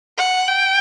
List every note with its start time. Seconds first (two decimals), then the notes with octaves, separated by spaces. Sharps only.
0.18 F#5
0.48 G5